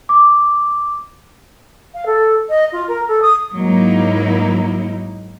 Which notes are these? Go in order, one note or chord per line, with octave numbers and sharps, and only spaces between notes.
D6
F5
A4
D#5
F4
A#4
A4
D#6
G#2 F#3 A#3 D#4 E4